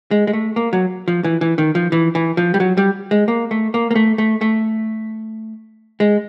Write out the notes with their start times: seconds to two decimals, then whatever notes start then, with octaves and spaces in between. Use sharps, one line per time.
0.11 G#3
0.27 G#3
0.33 A3
0.56 A#3
0.73 F#3
1.08 F3
1.24 E3
1.41 E3
1.58 D#3
1.75 F3
1.92 E3
2.15 E3
2.37 F3
2.54 G3
2.60 F#3
2.77 G3
3.11 G#3
3.28 A#3
3.51 A3
3.74 A#3
3.91 A#3
3.95 A3
4.18 A3
4.41 A3
6.00 G#3